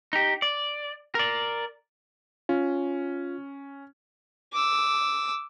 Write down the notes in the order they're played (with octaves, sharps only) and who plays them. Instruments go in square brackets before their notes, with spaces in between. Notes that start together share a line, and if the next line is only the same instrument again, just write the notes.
[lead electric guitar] D#4 G4
D5
A#4 D5
[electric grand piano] C#4 [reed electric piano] F4
[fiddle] D6 E6